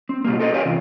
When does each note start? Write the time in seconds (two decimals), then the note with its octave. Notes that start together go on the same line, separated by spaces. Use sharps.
0.09 C4
0.24 B2 G3 A#3
0.39 A4 A#4 C5 D5 D#5
0.52 G4 A#4 C#5 D5 F5 G#5
0.65 C3 E3 C4 F4